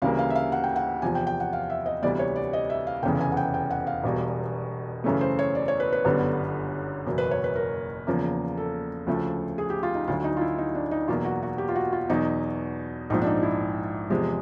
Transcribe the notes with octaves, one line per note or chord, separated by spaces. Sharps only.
D2 C#3 E3 G3 A#3 F5
F5
E5
F5
F#5
G5
F#5
E2 C3 F3 G#5
G5
G5
F#5
F5
E5
D#5
D2 C3 E3 G3 B3 D5
C#5
D5
D#5
E5
F5
F1 E2 C#3 E3 G5
G#5
F#5
G5
G5
F#5
F5
E1 E2 B2 G3
F#2 C#3 E3 A3
C5
C#5
D5
C#5
B4
B4
G1 F#2 D3 G3 B3
F#1 E2 B2 F#3
B4
C#5
B4
A#4
E2 C#3 F3 A#3
A4
D2 C#3 F3 A3
G#4
G4
F4
D#4
D2 D3 F#3 F4
D#4
F4
E4
D#4
D4
D#4
E2 B2 F#3 A#3 F4
F#4
F#4
G4
F4
F#4
F4
E2 B2 F#3 D#4
A#1 G#2 F3 D#4
D4
D#4
E4
E2 C3 F3 G#3